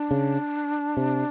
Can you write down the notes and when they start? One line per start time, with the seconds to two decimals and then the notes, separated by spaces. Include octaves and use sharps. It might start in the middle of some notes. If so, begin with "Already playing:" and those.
Already playing: D4
0.11 C#3
0.97 C3